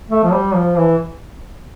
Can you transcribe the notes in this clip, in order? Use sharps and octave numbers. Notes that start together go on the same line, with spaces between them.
A3
F3
G3
F3
E3